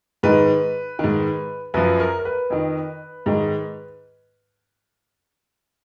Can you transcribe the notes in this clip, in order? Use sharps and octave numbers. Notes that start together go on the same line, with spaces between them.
G#2 D#3 B4
G#2 D#3
F#2 F3 B4
A#4
A#4
B4
F2 D#3
G#2 D#3